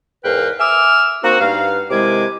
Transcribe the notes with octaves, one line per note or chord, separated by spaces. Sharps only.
E2 G#2 A#4 B4 F5 G5
E5 G#5 D6 E6 F6
A#3 C4 D#4 F#4
G2 B3 D#4 F5
C3 D#3 G#3 E4 G#5 D6